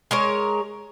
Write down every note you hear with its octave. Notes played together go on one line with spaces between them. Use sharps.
G#3 A#4 C#5